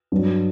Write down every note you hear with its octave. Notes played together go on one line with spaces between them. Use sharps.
G2 F#3